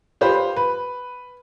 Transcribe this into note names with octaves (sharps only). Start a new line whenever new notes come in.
F4 G4 B4 C5 B5
B4